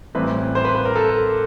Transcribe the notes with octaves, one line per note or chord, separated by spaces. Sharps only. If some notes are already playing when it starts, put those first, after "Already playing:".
A1 A2 E3 G3 C4 B4
C5
B4
B4
A#4
A4